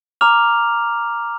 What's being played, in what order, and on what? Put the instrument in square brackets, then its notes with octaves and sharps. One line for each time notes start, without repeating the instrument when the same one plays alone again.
[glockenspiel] A#5 D6 F6 F7